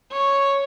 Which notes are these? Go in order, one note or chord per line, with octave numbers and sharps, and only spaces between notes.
C#5